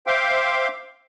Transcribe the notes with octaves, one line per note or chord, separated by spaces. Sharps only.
C5 E5 F5 G5 C6 D6